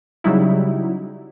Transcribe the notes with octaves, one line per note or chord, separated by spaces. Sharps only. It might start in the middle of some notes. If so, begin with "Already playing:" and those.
C#3 F#3 G3 D#4 E4